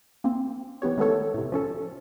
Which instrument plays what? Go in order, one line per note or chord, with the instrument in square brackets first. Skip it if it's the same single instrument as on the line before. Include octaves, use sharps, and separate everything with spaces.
[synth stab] A#3 C4
E3 B3 G4 C#5
D#3 G#3 A3 B3 A4 C#5
A2 C3
F3 C#4 A4